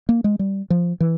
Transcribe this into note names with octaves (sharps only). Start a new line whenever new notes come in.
A#3
G#3
G3
F3
E3